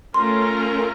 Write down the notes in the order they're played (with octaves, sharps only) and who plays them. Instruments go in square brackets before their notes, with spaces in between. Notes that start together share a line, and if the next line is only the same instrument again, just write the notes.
[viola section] A3 C#4 F4 A#4 [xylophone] C6